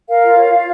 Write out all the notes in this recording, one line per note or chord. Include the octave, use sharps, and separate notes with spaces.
A#4 F5
F4
C#5
F4